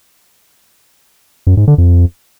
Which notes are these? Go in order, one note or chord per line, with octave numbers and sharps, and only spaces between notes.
F#2
G#2
D3
F2